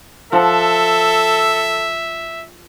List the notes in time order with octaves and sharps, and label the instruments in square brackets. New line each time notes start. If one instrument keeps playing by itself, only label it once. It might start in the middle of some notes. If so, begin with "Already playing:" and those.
[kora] F3 F#5 [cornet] A4 [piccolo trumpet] E5